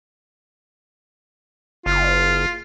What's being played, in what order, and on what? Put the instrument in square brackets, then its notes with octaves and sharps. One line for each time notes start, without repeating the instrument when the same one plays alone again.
[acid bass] F#1 [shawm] F4